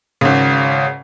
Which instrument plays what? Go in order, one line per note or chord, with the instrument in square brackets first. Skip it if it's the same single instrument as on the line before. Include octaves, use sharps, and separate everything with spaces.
[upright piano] G#1 C#3